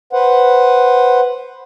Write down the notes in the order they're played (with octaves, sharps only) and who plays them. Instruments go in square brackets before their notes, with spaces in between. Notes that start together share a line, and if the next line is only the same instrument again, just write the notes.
[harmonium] B4 C5 F#5